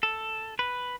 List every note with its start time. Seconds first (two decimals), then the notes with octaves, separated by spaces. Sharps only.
0.03 A4
0.59 B4